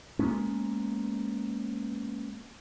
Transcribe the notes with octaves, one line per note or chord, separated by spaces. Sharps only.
G#3 A#3 B3 C#4